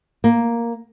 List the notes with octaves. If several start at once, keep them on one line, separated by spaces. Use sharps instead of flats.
A#3